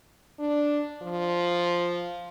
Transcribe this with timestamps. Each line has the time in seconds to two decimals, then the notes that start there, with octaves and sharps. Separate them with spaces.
0.39 D4
1.02 F3